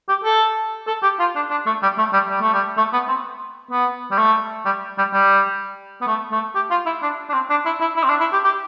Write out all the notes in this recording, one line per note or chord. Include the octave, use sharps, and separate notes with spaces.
G4
A4
A4
G4
F4
D4
D4
A3
G3
A3
G3
G3
A3
G3
A3
B3
C4
B3
G3
A3
G3
G3
G3
B3
A3
A3
G4
F4
E4
D4
D4
C4
D4
E4
E4
E4
C4
D4
E4
G4
G4